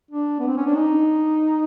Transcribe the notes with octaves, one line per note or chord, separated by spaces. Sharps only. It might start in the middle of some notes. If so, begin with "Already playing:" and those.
D4
B3
C4
C#4
D4
D#4